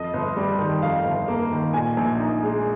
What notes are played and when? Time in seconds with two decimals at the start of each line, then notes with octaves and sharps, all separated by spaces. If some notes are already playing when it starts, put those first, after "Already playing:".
Already playing: F2 D#5
0.13 G1
0.36 G3
0.59 D#3
0.82 F2 F5
1.05 G1
1.28 A#3
1.51 D#3
1.73 A#2 G#5
1.97 A#1
2.20 D#4
2.43 G#3